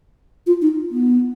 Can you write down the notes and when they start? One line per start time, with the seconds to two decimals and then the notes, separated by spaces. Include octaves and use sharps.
0.47 F4
0.62 D#4
0.91 B3